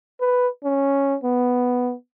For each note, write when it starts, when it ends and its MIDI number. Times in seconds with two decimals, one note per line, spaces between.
0.20 0.48 71
0.64 1.16 61
1.24 1.94 59